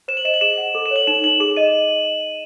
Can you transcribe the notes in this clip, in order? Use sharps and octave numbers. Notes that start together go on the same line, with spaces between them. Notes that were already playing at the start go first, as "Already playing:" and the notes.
C5 E7
F#7
D#5 E7
F#7
G#4 E7
F#5
A4
E7
C#5 F#7
D#4 E7
D#4 F#7
G#4 E7
D#5 D#7